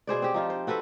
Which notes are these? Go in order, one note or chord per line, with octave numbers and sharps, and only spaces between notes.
B2 G#4 C5 D5
C4 G4
F3 D#4 F4
C5
C4 F#4 A4 B4